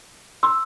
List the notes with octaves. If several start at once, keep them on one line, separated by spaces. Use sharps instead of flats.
C6 E6